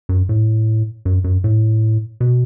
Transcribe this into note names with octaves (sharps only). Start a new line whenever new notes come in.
F#2
A2
F#2
F#2
A2
B2